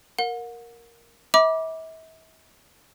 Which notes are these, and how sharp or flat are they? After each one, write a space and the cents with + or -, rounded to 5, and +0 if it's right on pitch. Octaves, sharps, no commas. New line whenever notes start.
A#4 +0 F#5 -40
E5 -40 B5 -30 D6 +0